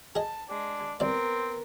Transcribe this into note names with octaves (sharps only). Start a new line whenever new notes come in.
G#4 D#5 A5
G#3 D4
C2 B3 C4 A#4 D5